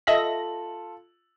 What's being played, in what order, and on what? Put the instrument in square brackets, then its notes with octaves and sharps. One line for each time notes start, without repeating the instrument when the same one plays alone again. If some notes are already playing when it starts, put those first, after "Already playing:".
[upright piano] F4 A4 F#7 [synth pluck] D#5 E5 A#6